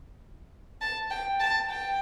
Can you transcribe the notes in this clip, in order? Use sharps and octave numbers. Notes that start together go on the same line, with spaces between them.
A5
G5
A5
G5